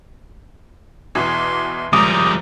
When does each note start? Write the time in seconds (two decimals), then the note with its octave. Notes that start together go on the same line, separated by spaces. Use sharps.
1.15 E2 B2 E3 C6
1.93 F#1 G#2 F3 G3 A#5 D6 D#6